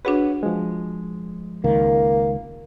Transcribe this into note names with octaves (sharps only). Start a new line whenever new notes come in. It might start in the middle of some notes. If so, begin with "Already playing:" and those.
D4 F#4 G#4 B4 C#5 F#5
F3 G#3
C#2 D#3 A#3